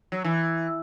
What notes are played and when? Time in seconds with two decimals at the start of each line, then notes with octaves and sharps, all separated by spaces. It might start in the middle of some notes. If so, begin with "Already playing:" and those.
0.12 F#3
0.24 E3